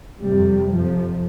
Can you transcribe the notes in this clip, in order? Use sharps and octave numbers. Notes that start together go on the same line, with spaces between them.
F2 C3 G3
F2 C3 F3